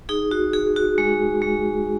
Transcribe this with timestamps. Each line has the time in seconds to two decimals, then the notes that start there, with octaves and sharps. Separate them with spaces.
0.09 D#4 G#4
0.31 F#4
0.53 F#4 G#4
0.76 F#4
0.98 G#3
1.42 G#3